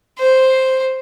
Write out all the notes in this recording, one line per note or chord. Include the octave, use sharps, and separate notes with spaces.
C5